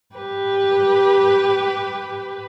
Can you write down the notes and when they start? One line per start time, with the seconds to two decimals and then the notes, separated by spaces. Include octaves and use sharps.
0.15 G4 B4